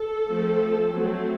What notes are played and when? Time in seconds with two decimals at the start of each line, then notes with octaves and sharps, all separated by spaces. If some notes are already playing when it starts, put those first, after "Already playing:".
Already playing: A4
0.28 F3 A3 C4
0.91 F#3 A3 C4